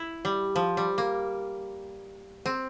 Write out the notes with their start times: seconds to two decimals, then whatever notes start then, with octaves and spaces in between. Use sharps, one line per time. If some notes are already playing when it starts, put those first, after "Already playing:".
Already playing: E4
0.25 G3
0.56 F3
0.77 G3
0.98 A#3
2.46 C4